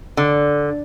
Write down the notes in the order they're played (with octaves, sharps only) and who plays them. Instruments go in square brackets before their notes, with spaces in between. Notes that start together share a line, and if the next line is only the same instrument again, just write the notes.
[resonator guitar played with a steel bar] D3